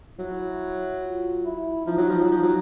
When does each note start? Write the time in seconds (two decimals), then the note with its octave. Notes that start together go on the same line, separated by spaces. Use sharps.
0.18 F#3 E4
1.03 F4
1.45 E4
1.86 F3 D#4
1.97 F#3
2.10 F3
2.21 F#3
2.32 F3
2.43 F#3